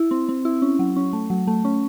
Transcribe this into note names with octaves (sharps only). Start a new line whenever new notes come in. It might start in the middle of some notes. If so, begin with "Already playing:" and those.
Already playing: E4
C4
C4
E4
C#4
F#3
C#4
A3
F#3
A3
C#4